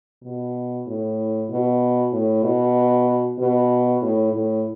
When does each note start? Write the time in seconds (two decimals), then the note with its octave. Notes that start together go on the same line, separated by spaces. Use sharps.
0.23 B2
0.87 A2
1.50 B2
2.13 A2
2.43 B2
3.38 B2
4.02 A2
4.33 A2